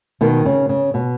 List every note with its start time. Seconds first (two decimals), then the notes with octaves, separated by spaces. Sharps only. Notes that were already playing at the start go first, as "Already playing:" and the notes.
0.21 B2 D#3
0.46 C#3
0.69 C#3
0.94 B2